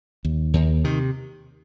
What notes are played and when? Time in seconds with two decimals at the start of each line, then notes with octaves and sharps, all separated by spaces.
0.25 D#2
0.54 D#2
0.84 C3 D#3